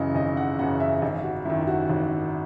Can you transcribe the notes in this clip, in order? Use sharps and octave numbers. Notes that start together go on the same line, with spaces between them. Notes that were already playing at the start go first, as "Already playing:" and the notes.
Already playing: G#1 F#2 C#3 E3 D#5
G#1 D#5
F#5
F#2 C#3 E3 F#5
E5
G#1 D#5
F#4
F#2 D#3 E4
E4
F#4
G#1